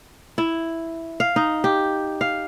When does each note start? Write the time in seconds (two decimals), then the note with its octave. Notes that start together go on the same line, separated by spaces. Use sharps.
0.38 E4
1.20 F5
1.36 D#4
1.64 G4
2.21 F5